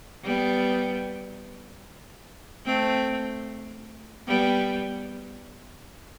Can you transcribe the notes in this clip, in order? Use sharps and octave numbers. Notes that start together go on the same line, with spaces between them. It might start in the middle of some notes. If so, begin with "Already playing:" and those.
G3 B3
A3 C4
G3 B3